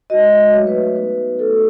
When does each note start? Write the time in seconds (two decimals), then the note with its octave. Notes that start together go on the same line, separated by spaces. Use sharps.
0.10 G#3 D#4 F#4 D#5
0.32 E5
0.53 F#3 A3 D#4 F#4 C#5
0.67 B4
0.82 B4
0.96 B3 D#4 F#4 B4
1.39 A3 D#4 F#4 A4